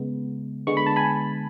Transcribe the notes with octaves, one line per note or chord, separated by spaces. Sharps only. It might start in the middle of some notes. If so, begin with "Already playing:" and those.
Already playing: C#3 G#3 B3
D3 G#3 B3 C#6
B5
A5
G#5 B5